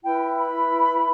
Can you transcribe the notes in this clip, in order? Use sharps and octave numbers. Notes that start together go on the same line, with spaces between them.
E4 B4 G5
B5